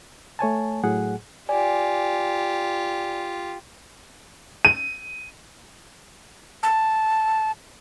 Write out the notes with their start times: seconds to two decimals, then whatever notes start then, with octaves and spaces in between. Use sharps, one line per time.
0.39 A3 C#5 G#5 A5
0.84 A2 F#3 G#4 F#5
1.49 F4 G4 D5 G#5
4.65 D#7
6.63 A5